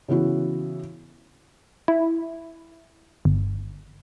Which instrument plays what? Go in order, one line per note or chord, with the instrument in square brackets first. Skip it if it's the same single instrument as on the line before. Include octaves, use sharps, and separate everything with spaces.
[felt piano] C#3 E3 B3 E4 F#4
[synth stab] E4
G1